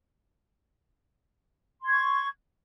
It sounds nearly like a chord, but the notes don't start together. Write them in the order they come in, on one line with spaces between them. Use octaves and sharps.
C6 G#6 C#6